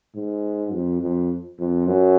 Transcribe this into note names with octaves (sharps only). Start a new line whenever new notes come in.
G#2
F2
F2
F2
F#2